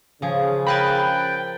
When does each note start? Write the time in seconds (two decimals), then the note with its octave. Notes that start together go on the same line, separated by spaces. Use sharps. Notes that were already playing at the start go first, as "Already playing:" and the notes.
0.22 C#3 F3 G#4
0.66 A#4 F5 G5 G#5 B5 F#6 A6